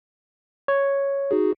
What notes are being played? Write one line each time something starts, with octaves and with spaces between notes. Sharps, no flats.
C#5
D#4 F#4 G#4